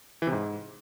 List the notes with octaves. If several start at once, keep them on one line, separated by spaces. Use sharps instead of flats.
E3
C3
G#2